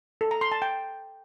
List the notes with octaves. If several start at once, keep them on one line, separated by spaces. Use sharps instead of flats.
A4
A#5
C6
A5
G5